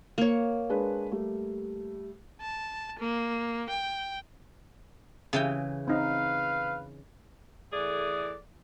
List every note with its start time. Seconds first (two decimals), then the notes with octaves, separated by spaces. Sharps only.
0.18 A#3 C#5
0.70 G#3 D4 B4
1.12 G3 A3
2.41 A5
2.99 A#3
3.69 G5
5.33 C#3 E3 G5
5.88 C4 D#4 B4 F5
7.72 E3 A3 G#4 A4 D5